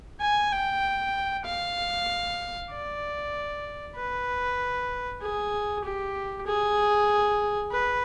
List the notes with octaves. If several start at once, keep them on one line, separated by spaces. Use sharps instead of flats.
G#5
G5
F5
D5
B4
G#4
G4
G#4
B4